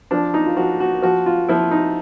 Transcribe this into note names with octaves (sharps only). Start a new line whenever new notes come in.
F3 D4
D#4
F4
F3 F#4
F#4
F3 F#4
F4
F3 E4
D#4